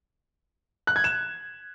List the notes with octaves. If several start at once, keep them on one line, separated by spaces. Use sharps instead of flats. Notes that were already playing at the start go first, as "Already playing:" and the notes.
F#6
G#6
E7